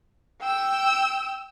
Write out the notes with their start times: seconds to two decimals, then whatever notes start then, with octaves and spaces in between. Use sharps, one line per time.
0.41 G5 E6